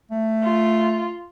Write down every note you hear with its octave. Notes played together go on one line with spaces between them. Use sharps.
A3
F4